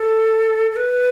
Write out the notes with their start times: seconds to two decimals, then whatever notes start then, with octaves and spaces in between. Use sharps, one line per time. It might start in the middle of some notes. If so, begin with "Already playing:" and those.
Already playing: A4
0.71 A4
0.76 B4